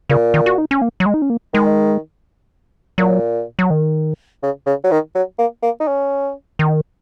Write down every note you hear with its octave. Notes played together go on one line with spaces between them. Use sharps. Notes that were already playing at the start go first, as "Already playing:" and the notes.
A#2 C#3
D#3
F#4
D#4
C#4
A#3
F#3
G#3
D#4
C#4
A#3
D#3 G#3
A#2 F#3
F#3
D#3
C#3
C#3
F#3
D#3
F#3
A#3
A#3
D#4
C#4
D#3